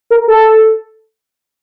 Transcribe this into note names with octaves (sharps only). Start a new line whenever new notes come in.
A#4
A4